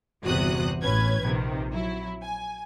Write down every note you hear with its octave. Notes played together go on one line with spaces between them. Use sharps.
G1 E2 C3 F#4 D#6 F#6
A1 C#4 B4 G#6
A#1 C3 D#3
F#3 E4
G#5